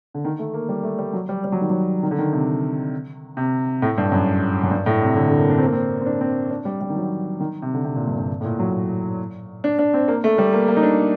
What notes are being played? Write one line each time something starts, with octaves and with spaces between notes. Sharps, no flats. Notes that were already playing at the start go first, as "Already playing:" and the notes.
D3
D#3
A3
A#3
G3
A3
G3
F#3
G3
G3
F#3
D#3
F#3
D#3
D3
D#3
C3
C3
A2
G2
F#2
F#2
G2
A2
C3
D3
D3
A#3
D4
C4
A#3
C4
C4
D4
C4
D4
G3
G3
D#3
F#3
D#3
C3
D3
C3
A#2
G2
G2
A2
A#2
F#3
D4
D4
C4
A#3
A3
G3
A#3
A#3
D#4
D4